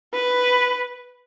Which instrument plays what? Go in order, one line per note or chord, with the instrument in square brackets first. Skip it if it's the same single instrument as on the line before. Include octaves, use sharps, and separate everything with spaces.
[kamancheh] B4